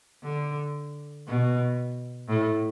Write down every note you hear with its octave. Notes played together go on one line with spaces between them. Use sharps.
D3
B2
A2